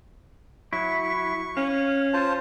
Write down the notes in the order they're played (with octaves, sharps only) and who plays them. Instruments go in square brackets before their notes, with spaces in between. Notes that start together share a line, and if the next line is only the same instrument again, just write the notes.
[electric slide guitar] F#3 E4 [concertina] C#6
[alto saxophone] C#4 [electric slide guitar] F5
[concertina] F4 C5 A5